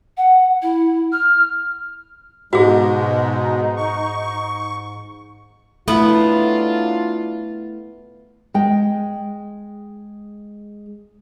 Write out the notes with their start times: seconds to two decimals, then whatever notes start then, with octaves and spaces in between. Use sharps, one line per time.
0.17 F#5
0.62 E4
1.12 F6
2.53 G#2 B2 G#3 D#4 F#4 G#4
3.77 C#6
5.88 F#3 A3 B3 D4 E4 F4
8.54 G#3 G5